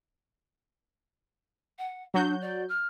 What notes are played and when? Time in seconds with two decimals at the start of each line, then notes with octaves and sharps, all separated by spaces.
1.78 F#5
2.14 F#3 D4 F#4 G6
2.41 D5
2.68 F6